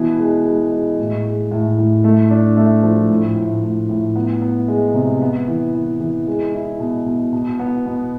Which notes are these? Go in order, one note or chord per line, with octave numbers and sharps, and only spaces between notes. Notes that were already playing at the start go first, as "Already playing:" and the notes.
Already playing: B2 E3
G#3
G#3
G#3
A2
G#3
A2
A2
A3
D4
A3
F3
A2
A2
A2
A2
B3
B3
G#3
C3
B3
E3
E3
E3
G#3
E4
B2
B2
B2
B3
B2